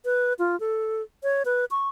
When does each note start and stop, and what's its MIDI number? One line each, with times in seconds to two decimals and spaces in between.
0.05 0.33 71
0.39 0.58 65
0.60 1.02 69
1.23 1.43 73
1.45 1.65 71
1.71 1.89 85